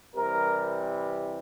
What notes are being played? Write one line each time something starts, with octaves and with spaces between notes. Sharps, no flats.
C3 E3 G3 A#4